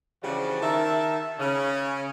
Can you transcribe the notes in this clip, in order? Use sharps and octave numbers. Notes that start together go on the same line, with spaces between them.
C#3 E3 F3 G3 D4 F#4
D#3 E5 A5
C#3 C#4